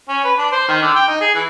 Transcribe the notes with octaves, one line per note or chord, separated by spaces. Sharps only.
C#4
B4
D4
C5
D#3
D3
G5
D#4
G#4
E3